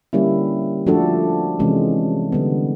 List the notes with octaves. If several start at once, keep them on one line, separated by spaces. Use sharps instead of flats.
D3 G3 A#3 C#4 E4
F3 A3 D4 F#4 A4
C3 E3 G#3 C#4
D3 G3 B3